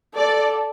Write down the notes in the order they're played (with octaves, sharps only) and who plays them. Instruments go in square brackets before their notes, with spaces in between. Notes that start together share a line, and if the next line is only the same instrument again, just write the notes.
[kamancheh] A4 [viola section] D5